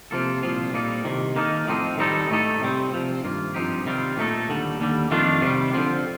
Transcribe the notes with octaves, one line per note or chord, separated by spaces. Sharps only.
C3 F3 A#3 F4 A4
C2 A#2 F3 C4 F4
A#2 G3 A#3 D#4 A4
C2 C3 D#3
D#3 A#3 D#4 A4
A2 F3 C4 D#4
D#3 G3 C4 D#4 A4
A2 A3 D#4 A4
C3 G3 C4
C3 F3 C4
G2 D#3 A#3 F4
G2 F3 C4 D#4 G4
C3 D#3 G3 C4 F4
A#2 A3 C4 D#4 A4
D#2 D3 G3
D#2 D3 G3
F2 D#3 A3 D4 F4
C3 D#3 G3
D3 F3 C4 F4